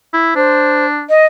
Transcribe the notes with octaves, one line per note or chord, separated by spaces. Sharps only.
E4
D4 C5
D#5